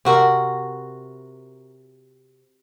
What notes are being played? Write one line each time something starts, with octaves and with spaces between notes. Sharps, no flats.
C3 F#4 A#4